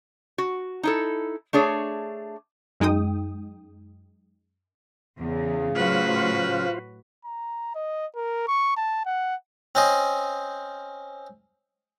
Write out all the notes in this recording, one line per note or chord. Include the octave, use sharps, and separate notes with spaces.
F#4
D#4 E4 A4
A3 D4 G#4 C#5
F#2 G#3 D#4 G5 D#6
E2 C#3
A2 F#3 F4 F#4 B4 C5 F5
A#5
D#5
A#4
C#6
A5
F#5
C4 C#4 C5 D#5